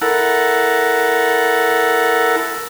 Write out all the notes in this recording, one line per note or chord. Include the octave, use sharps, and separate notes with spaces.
E4 A4 A#4 F#5